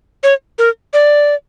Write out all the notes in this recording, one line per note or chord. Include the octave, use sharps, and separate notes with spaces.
C#5
A#4
D5